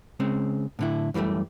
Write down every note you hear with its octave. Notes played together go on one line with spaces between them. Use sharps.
C#3 G#3 C4
A2 D3 E4
F#2 E3 F3 G3 A3